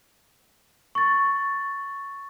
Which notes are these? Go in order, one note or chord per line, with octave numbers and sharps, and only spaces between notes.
C#6 A6